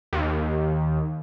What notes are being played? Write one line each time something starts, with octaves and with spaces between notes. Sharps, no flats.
D#2